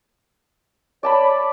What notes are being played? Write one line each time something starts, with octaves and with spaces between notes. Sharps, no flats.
C#5 D5 A5 B5